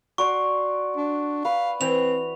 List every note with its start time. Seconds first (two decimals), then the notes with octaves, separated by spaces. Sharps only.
0.18 F#4 D5 C6 C#6
0.96 D4
1.45 B4 F5
1.81 E3 C4 G5 F7